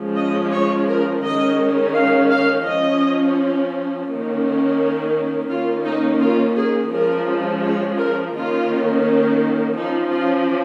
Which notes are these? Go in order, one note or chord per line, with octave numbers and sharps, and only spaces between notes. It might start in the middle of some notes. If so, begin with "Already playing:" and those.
Already playing: F3 G#3 C#4
D#5
C#5
A#4
D#3 G#3 C#4 D#5
F5
F5
F3 C#4 D#5
D#3 A#3 C#4
D#3 A#3 C#4 F4
D#4
F4
G#4
F3 G#3 C#4 A#4
C#5
A#4
D#3 A#3 C#4 F4
F3 C#4 D#4
F4